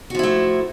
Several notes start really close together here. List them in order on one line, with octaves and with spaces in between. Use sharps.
F#4 F3 E4 A3